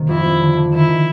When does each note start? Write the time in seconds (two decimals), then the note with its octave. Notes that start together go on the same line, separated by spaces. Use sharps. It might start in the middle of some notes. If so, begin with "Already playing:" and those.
Already playing: C3 D#3 A#3
0.09 F2 E4
0.25 F2
0.41 D3
0.56 D3
0.73 D#3 E4
0.89 D#3